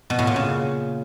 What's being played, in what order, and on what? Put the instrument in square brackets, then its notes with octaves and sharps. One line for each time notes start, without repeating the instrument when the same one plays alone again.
[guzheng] B2
A2
A#2
C#3